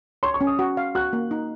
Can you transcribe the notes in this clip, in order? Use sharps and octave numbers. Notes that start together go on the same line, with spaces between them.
C#5 C6
C#6
C#4
D#6
F#4
F5
F#4 F#6
A#3
D#4